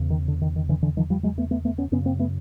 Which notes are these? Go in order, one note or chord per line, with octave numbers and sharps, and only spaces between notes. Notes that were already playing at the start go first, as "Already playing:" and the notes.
Already playing: E2 C#3
D#3
D3
D#3
D#3
D3 E3
D3 E3
D#3 F3
F3 G3
F#3 G#3
A3 B3
A3 B3
A3 B3
B3 C#4
F#2 C#3 B3 C#4
A#3 C4
A3 B3